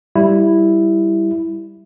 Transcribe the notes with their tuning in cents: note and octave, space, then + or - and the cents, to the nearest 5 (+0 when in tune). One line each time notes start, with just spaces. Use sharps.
G3 +0 E4 +0